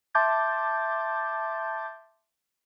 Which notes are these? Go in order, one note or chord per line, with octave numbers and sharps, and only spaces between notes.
E5 A5 C6 D6 G6 A6